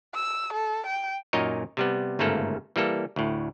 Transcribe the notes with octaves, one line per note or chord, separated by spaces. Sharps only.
E6
A4
G5
F#2 A#2 D#4 A#4 C#5 D#5
C3 G3 B3
G1 G#2 C#3 A3 A#3 A4
E3 G3 A#3 A4
D2 A2